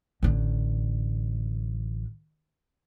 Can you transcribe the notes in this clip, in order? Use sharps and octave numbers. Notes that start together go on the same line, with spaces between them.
A1 D3